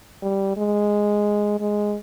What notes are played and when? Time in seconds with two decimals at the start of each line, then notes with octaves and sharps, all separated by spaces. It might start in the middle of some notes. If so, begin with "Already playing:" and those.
0.22 G3
0.57 G#3
1.60 G#3